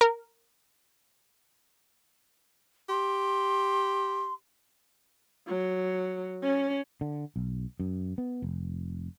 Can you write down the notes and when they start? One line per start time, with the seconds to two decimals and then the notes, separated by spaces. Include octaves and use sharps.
0.01 A#4
2.89 G4 C6
5.47 F#3
6.43 C#4
7.01 D3
7.36 B1
7.80 F#2
8.18 B3
8.42 F1